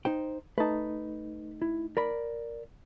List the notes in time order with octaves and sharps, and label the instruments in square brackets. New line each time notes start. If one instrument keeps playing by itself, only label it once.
[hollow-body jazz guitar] D#4 C5 G5
[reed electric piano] A3 D#4 [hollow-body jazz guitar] B4 A5
[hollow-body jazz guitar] E4
A#4 D5 B5